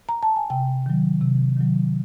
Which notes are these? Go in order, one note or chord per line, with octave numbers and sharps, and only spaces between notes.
A#5
A5
G#5
C3 G5
D#3 F#3
C3
D#3 F#3